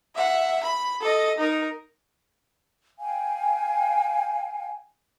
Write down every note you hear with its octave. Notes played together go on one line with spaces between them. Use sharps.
E5 F#5
B5
A4 D#5
D#4 A#4
F5 G5 G#5